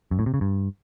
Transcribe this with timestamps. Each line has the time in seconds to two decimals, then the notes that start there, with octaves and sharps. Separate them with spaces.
0.11 F#2
0.19 A2
0.26 C3
0.34 C#3
0.41 G2